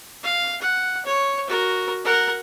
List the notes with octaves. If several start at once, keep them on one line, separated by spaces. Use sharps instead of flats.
F5
F#5
C#5
F#4 A#4
A#4 F#5